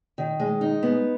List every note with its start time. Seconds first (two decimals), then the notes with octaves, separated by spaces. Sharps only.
0.18 D#3
0.40 G#3
0.61 D#4
0.83 B3